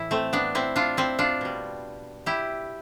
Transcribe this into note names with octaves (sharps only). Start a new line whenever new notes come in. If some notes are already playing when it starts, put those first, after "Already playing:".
Already playing: A2 E3 E4
A3 C4
B3 D4
C4 E4
D4 F4
C4 E4
D4 F4
B2 G3
E4 G4